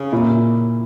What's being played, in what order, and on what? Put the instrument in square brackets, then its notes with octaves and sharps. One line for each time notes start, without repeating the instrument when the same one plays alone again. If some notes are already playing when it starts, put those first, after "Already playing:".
Already playing: [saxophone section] C#3
[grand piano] A#2 A#3 E4